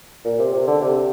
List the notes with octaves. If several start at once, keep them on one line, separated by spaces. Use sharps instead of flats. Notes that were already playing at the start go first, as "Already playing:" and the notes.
A#2
C3
C3
D3
C3